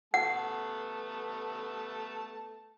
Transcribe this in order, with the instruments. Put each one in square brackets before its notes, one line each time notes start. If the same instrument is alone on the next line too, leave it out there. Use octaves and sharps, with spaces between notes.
[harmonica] A3 B3 A5 [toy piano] F#5